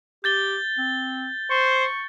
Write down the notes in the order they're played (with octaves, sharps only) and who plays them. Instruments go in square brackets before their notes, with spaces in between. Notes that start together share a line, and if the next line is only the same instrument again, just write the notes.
[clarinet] G4 [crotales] G6 A6 G7
[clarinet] C4
[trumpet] C5 [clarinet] C#6